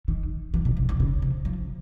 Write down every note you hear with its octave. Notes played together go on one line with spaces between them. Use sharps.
D#3
E3
B2
C3
D#3
C#3
C3
F3